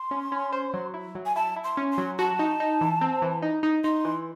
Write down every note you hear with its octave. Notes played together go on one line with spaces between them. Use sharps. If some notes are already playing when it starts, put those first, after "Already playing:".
Already playing: C6
C#4
C#4
C5
F#3
E4
F#3
G#5
E4 A5
E4
C6
C#4
C6
F#3
F#4 A5
D#4
D#4
E3
C4
E3
D#4
D#4
D#4 C6
E3